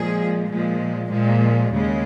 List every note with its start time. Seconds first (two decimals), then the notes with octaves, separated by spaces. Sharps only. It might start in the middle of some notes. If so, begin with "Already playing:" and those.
Already playing: A#2 F3 G#3 G#4
0.50 A#2 F3 G#3
1.11 A#2 F3 G#3
1.72 D#2 C#3 G#3